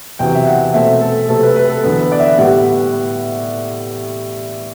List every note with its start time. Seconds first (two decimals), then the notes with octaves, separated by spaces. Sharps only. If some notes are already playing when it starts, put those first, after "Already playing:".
0.19 E2 C3 F#3 G5
0.35 E5
0.47 F#5
0.74 B2 A3 C4 E5
1.01 A4
1.29 C3 F#3 A3 C4 A4
1.43 B4
1.50 A4
1.56 B4
1.70 A4
1.83 E2 D3 F#3 B3 B4
2.02 B4
2.12 D5
2.20 E5
2.38 A2 G3 B3 F#5